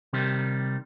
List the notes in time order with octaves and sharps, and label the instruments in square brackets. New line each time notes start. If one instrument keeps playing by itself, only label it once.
[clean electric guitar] C3 D#3 G3